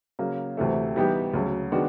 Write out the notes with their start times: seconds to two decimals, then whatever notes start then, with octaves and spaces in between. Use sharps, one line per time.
0.19 C#3 F#3 A#3
0.57 D2 C3 E3 A3
0.96 E3 G3 B3 D#4 G4
1.34 D2 C#3 F#3
1.72 D#3 G#3 B3 D4 F#4